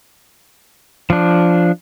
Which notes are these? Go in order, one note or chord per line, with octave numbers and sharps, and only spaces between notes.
F3 D4